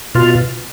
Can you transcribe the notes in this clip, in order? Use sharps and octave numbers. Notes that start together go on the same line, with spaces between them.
B2 F4